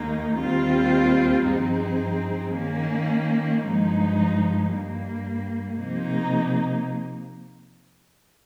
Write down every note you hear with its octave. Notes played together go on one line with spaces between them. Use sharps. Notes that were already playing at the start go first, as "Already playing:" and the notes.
Already playing: D#2 D#3 A#3 D#4
D#2 D#3 G3 C4 F4
G2 F3 C4 D#4 G#4
D#3 A#3 C#4
G2 F3 G#3 D#4
G2 G3 A#3
C3 F3 A#3 D#4